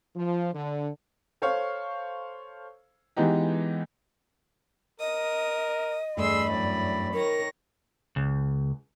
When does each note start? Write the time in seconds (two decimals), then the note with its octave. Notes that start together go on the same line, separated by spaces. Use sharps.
0.16 F3
0.53 D3
1.42 A4 C5 C#5 F5 C#6
3.17 E3 G#3 B3 D#4 G4
5.00 A#4 D#5 D#6
6.17 E2 G2 A3 G#4 B5 C6 E6
6.51 F#2 A2 D5
7.14 D#3 A#4 C#5 A#6
8.16 C#2